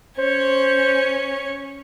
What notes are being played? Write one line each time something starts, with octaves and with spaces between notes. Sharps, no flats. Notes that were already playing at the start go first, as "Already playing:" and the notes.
C#4 C5 C#5